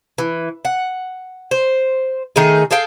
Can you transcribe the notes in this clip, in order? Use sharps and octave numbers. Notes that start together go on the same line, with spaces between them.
E3
F#5
C5
D#3 A3 D#4 G#4
G#4 A4 F5 G5